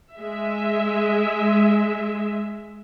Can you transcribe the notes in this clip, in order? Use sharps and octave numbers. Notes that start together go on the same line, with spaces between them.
G#3 E5